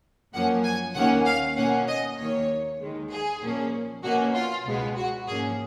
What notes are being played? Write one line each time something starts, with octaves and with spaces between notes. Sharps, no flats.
F#2 F3 A#3 C#4 F#5
G#5
D#2 D#3 A#3 C#4 F#5
F5
B2 A#3 C#4 F#5
D#5
D#2 D#3 A#3 C#5
D#2 D#3 G#3
G#4
A#2 F3 A#3 C#4
B2 A#3 C#4 F#4
F4
C#2 B2 G#3 B3
F#4
G#2 F3 A#3 C#4 G#4